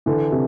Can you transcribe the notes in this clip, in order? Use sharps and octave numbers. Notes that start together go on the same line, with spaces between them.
D3 E3
C3